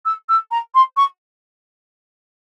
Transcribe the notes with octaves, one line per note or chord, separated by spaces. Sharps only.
E6
E6
A#5
C6
C#6